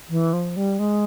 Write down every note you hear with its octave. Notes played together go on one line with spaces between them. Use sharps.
E3
F3
G3
G#3